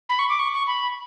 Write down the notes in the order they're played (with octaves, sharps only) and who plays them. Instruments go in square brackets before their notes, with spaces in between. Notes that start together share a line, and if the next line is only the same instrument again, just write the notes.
[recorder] B5
C#6
D6
C#6
C#6
B5